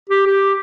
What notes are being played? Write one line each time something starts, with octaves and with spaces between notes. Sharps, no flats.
G4
G4